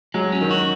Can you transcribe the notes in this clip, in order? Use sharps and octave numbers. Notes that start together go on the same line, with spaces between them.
F#3 G#3
C#4
D#3
F#4